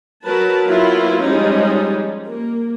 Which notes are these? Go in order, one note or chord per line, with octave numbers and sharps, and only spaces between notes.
F#3 A#4 B4 A5
F#3 A#3 B3 E4 F4
F3 G3 G#3 C#4 D#4
A#3